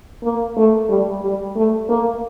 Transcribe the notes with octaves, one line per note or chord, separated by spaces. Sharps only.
A#3
A3
G3
G3
A3
A#3